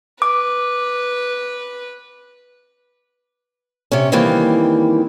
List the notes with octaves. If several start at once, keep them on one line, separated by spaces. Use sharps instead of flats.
B4 D6
C3 C#4
D#3 E3 G3 A#3 C4